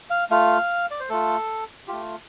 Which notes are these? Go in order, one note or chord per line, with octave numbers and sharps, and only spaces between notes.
F5
A3 F4 F5
D5
C5
A3 F4 A4
A3 F4 G4